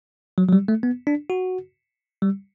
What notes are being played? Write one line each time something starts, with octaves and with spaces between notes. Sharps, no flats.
F#3
F#3
G3
A3
B3
D4
F#4
G3